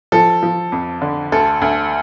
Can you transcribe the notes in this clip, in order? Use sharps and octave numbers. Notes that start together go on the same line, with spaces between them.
F3 A4
F3
F2
D3
D2 A4
D2